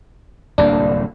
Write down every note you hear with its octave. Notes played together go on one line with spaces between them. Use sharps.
D1 C2 A#3 D4